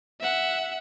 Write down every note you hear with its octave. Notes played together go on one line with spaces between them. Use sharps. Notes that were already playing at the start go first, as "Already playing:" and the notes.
E5 F#5